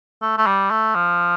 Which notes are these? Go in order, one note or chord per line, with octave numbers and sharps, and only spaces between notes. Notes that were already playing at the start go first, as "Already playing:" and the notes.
A3
A3
G3
A3
F3